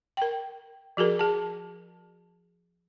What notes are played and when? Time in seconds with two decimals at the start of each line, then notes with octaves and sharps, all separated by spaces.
0.17 A#4 G5
0.97 F3 F#4 G#4 A#4
1.19 G#4 A5